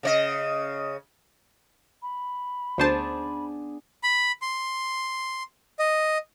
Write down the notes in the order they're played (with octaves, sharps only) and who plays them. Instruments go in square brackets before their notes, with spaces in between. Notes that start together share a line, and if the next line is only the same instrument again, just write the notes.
[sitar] C#3 C#5 D#5
[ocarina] B5
[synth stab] D2 C5 A5 [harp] B3 D4 G#4
[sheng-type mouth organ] B5
C6
D#5